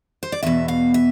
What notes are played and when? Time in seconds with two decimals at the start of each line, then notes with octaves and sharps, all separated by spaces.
0.23 C5
0.32 D5
0.43 E2 B2 E5
0.68 F5
0.94 E5